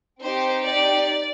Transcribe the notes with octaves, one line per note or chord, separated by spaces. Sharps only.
C4 D#4 G4 C5
D5